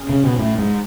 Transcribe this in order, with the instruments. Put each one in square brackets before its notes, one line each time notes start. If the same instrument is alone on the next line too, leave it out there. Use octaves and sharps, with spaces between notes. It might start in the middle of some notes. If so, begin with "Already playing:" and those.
Already playing: [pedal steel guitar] C#4 G#4
[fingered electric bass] C#3
B2
A2
G#2